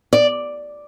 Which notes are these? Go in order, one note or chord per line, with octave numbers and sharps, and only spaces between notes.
D5